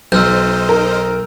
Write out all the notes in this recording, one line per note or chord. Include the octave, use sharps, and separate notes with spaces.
B1 D#4 C5 D#5 E6 F6 G6
A#4